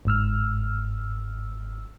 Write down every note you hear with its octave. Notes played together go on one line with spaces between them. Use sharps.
G1 G#2 E6 F6